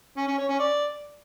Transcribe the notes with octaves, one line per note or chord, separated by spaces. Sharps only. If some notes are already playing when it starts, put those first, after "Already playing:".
C#4
C#4
C#5
C#4
D5